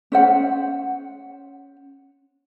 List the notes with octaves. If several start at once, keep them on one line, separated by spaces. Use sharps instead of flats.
C#4 C5 F#5